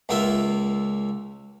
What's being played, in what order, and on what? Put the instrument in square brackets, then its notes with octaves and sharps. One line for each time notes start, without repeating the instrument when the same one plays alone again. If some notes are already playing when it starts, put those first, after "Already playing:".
[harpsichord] C#2 A#3 F4 E5